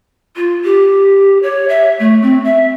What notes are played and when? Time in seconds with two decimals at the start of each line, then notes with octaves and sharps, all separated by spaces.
0.36 F4
0.64 G4
1.43 C#5
1.69 E5
2.00 A3
2.22 C4
2.45 E5